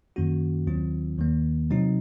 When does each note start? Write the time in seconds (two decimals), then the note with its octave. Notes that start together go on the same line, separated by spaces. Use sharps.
0.16 F#2 D#3 A#3 C#4 F#4
0.67 D#2 D#3 F#3 C4 F4
1.18 D#2 D#3 A#3
1.70 C3 F#3 C4 D#4